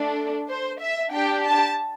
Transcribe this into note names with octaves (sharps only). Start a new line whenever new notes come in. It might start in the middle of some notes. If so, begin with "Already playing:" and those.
Already playing: A3 D4 A4
C5
E5
D4 G4 G5
A5